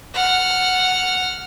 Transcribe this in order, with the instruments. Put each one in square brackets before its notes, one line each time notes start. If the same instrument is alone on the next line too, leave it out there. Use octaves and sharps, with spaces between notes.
[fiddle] F#5 F6